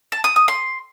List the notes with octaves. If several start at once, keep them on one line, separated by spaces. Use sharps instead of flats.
A5
D#6
D#6
C6